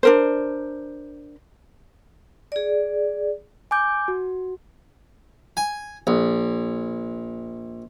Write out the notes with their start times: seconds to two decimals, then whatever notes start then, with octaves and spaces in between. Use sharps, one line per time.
0.03 D4 A#4 C5
2.52 G#4 D5
3.71 G#5 D6 G6
4.08 F#4
5.57 G#5
6.07 A#1